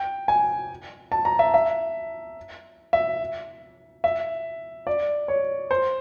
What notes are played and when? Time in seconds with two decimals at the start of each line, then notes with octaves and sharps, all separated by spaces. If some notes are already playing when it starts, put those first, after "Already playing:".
Already playing: G5
0.28 G#5
1.12 A5
1.25 A#5
1.39 E5
1.54 E5
2.93 E5
4.04 E5
4.87 D5
5.28 C#5
5.71 C5